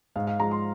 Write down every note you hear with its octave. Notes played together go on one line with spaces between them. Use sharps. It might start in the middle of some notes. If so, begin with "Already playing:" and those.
G#2 F5
F5
F3 G#3 A#5
C6